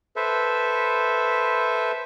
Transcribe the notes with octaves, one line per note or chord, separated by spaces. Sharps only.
A4 B4 C5 E5